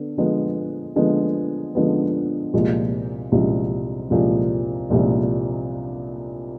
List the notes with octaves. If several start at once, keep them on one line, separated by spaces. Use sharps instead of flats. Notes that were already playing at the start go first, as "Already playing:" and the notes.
Already playing: D3 B3
D3 F3 G#3 B3
D3 F3 G#3 B3
D3 F3 G#3 B3
C2 A#2 F3 G#3
C2 A#2 F3 G#3
C2 A#2 F3 G#3
C2 A#2 F3 G#3